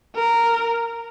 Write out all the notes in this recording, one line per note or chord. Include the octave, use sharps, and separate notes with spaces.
A#4